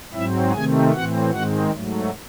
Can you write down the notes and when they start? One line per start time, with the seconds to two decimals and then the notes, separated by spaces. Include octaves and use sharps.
0.13 G#2 F#3 C4 E4 E5
0.53 C3 D#3 A3 C4 G#4 G#5
0.92 A2 E3 C4 F#4 F#5
1.31 G#2 D#3 G#3 C4 F#4 F#5
1.71 G#2 F#3 A3